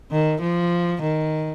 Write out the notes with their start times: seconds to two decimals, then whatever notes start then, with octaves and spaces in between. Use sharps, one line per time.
0.11 D#3
0.41 F3
1.02 D#3